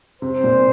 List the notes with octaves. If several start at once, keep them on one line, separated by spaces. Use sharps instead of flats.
C3 C5
A#2